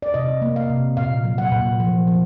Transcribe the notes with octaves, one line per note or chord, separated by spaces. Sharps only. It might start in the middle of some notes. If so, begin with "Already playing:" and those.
D5
C3 D#5
A#3
F5
C3
A#2 F5
F#3
F#5
A#2
F3
F3